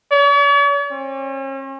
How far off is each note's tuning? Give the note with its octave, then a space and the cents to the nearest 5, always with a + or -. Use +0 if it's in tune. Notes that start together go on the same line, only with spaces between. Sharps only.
C#5 +45
C#4 -40